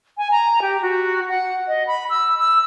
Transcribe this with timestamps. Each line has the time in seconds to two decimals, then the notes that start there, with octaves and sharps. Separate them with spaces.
0.18 G#5
0.31 A#5
0.62 G4
0.82 F#4
1.28 F#5
1.68 D#5
1.87 B5
2.10 E6
2.38 E6